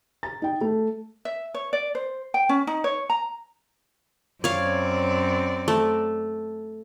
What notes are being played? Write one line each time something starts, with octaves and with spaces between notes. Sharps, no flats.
A#5 A6
D#4 G5
A3
E5
C#5
D5
C5
G5
C#4
D#4
C#5
A#5
F#2 C4 C#5 D5 F5
A3